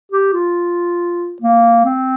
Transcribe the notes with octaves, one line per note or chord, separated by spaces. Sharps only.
G4
F4
A#3
C4